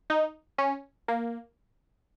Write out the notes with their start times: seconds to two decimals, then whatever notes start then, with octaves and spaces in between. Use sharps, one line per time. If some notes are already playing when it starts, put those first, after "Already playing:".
0.10 D#4
0.58 C#4
1.08 A#3